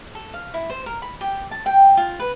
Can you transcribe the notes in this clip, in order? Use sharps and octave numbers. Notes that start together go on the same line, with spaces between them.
A4
F5
E4
C5
A#4
B5
G4
A5
G5
F4
B4